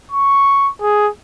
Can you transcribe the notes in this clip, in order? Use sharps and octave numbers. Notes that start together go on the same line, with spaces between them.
C#6
G#4